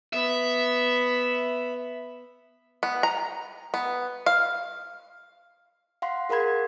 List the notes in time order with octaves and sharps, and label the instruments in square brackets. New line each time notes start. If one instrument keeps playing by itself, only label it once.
[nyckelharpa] B3 B5 [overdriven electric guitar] E5
[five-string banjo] B3
A#5
B3
F5
[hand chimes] F5 F#5 C6
G#4 A#4 F#5 B5 G#6